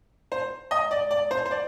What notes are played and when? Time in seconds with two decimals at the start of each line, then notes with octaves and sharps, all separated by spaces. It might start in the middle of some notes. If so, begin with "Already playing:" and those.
0.32 C5
0.71 D#5
0.91 D5
1.11 D5
1.31 C5
1.46 C5
1.51 D5